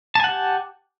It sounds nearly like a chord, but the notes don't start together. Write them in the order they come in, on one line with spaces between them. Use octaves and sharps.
A5 G#5 F#5 G4